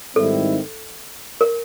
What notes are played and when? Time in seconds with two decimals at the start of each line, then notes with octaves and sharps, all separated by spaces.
0.16 G#2 D#3 G3 C4 E4 A4
1.41 A#4